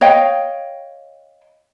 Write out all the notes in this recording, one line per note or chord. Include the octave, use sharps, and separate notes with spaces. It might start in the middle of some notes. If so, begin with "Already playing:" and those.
C#5 D#5 F5 G5